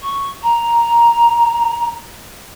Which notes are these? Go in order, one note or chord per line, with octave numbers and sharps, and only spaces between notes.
C#6
A#5